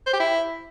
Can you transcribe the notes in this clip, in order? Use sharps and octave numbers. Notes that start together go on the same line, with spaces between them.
C5
G4
E4